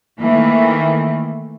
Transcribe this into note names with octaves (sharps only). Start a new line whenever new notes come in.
D#3 E3 A3 A#3